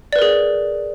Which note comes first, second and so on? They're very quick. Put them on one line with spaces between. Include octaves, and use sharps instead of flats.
D5 B4 A#4 G#4